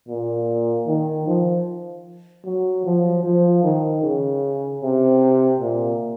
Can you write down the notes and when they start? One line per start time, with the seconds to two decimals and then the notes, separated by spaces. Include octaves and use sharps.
0.08 A#2
0.87 D#3
1.27 F3
2.45 F#3
2.85 F3
3.23 F3
3.63 D#3
4.03 C#3
4.82 C3
5.60 A#2